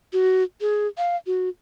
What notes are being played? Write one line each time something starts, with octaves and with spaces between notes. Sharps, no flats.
F#4
G#4
F5
F#4